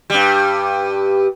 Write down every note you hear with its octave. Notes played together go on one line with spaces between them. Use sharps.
G2 G3